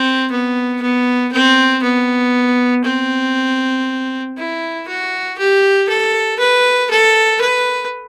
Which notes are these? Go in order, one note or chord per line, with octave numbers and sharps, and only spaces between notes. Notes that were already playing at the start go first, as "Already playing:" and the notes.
Already playing: C4
B3
B3
C4
B3
C4
E4
F#4
G4
A4
B4
A4
B4